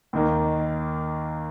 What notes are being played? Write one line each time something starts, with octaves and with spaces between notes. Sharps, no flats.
D#2 D#3 A#3 D#4